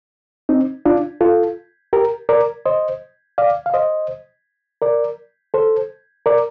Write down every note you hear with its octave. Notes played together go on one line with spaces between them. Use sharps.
C4 D#4
D4 F4
F4 A4
G4 A#4
A#4 D5
C5 D#5
D5 F5
F5
C5 D#5
A#4 D5
A4 C5
A#4 D5